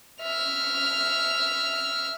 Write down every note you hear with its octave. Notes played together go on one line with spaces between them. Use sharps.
E5 F6